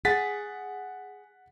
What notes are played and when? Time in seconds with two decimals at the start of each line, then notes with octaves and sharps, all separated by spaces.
0.05 G#4 F#5 A6 B6